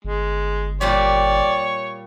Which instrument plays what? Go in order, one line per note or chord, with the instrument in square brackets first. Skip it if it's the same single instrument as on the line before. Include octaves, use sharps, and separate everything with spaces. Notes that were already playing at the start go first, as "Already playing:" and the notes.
[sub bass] G1 [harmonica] G#3
[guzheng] A#2 G3 G4 [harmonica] C#5 [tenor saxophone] D5